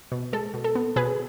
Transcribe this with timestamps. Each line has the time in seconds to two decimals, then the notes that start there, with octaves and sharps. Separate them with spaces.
0.12 B2
0.33 G#3 A4
0.54 B2
0.64 A4
0.75 B3
0.96 B2 G#4 B4